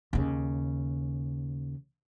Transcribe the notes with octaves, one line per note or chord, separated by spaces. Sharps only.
D#2 C#3